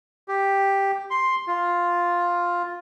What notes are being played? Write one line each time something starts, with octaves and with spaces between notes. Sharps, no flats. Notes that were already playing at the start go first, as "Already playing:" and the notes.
G4
C6
F4